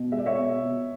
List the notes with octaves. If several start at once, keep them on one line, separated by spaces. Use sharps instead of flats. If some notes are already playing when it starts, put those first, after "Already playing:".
Already playing: B2
G#3 E5
D5
C#5 E5
B2
B2